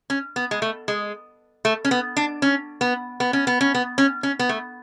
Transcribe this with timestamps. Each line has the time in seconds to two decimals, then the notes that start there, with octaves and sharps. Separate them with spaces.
0.10 C#4
0.36 B3
0.51 G#3
0.62 A3
0.88 G#3
1.65 A3
1.85 C#4
1.91 B3
2.17 D4
2.42 C#4
2.81 B3
3.20 B3
3.33 C#4
3.47 B3
3.61 C#4
3.75 B3
3.98 C#4
4.23 C#4
4.39 B3
4.49 A3